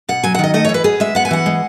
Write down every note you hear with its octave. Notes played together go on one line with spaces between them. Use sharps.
B2 F#5
F#3 G#5
F#5
D#3 D#5
A3 D#5
C#5
E3
B4
B3 G#4
G#3 E5
B3 F#5
G#5
E3 F#5
G#3